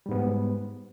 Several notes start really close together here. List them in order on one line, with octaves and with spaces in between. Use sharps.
G3 G#2 B3